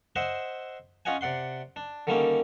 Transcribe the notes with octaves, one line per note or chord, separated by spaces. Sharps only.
C5 D#5 E5 F#5 C6
C#4 F4 D#5 F#5 G#5
C3 D5 F#5 C6
D4
D3 D#3 G3 A#3 C#4 D#4